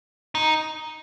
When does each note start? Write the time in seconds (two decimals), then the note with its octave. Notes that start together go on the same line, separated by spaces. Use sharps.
0.35 D#4